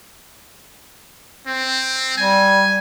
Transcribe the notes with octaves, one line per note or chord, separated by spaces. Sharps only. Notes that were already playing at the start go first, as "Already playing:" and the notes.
C4
G3 G#5